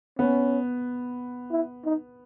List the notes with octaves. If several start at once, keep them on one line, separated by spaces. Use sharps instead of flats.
B3 C#4
E4
D#4